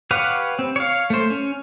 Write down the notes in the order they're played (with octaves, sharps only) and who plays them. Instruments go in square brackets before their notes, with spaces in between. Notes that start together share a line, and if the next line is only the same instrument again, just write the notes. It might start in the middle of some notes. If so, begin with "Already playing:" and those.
[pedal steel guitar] G4 B4 C#5 F5 F#5
C4
C#5 F5
A3 C5
C#4